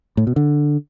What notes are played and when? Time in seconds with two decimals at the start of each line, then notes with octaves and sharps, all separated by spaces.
0.17 A2
0.27 B2
0.36 D3